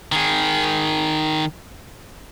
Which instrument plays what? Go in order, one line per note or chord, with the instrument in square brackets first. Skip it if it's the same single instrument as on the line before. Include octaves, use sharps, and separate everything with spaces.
[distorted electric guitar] D#3 G#4